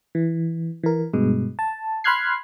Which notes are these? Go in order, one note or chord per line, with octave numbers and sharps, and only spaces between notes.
E3
E3 A#4
G2 B2 G#3
A5
B5 C6 F6 F#6 G#6 C7